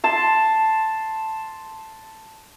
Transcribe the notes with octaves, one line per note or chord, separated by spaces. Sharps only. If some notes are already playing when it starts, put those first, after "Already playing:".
A5 C6